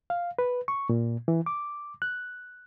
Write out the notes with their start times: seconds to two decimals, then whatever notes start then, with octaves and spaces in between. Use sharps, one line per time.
0.10 F5
0.39 B4
0.68 C#6
0.89 A#2
1.28 E3
1.46 D6
2.02 F#6